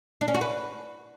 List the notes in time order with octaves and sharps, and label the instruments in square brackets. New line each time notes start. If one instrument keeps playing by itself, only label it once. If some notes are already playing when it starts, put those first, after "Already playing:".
[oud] D4
C#4
F#4
B4